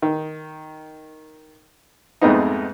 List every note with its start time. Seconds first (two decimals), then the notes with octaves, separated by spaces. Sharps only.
0.02 D#3
2.21 F2 G#2 A3 B3 C4 D#4